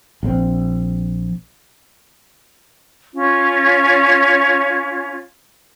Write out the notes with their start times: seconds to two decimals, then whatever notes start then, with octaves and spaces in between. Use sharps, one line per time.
0.23 A#1 C#3 C4
3.13 C#4 F4 C#5